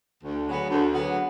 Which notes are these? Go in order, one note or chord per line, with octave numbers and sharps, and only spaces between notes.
D2
C#3 F#3 B3
D2
C#3 F#3 B3